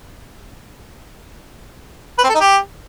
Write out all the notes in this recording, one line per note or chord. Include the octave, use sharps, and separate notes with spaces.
B4
C4
A4
D#4
G4